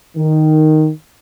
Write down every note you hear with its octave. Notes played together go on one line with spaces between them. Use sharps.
D#3